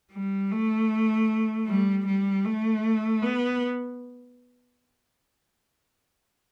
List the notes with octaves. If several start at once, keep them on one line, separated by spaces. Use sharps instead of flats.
G3
A3
G3
G3
A3
B3